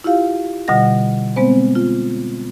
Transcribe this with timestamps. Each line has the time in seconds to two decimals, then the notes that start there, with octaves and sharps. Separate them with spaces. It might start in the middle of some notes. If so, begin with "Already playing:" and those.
0.04 E4 F4 G4 F5
0.68 B2 D3 G3 D#5 F#5 A#6
1.36 G#3 B3 C4 C5
1.75 F4